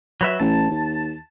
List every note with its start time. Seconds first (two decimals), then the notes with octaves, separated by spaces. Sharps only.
0.21 F#3 B4 E5
0.40 A1 A5
0.71 D#2